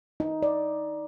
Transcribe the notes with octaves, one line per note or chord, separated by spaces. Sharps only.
D#4
D5